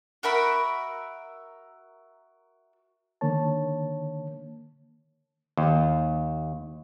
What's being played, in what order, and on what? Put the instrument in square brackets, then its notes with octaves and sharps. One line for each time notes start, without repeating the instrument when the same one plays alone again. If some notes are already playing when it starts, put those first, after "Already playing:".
[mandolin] F#4 A#4 E5 B5
[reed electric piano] D3 D#3 A#3 C#5 A5
[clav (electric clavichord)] D#2